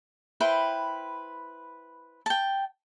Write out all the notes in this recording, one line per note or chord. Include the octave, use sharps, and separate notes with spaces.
E4 B4 C5 G5
G5 A5